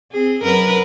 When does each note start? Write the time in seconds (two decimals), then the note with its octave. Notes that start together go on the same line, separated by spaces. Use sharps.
0.12 C4 G#4
0.42 F#2 A#4 B4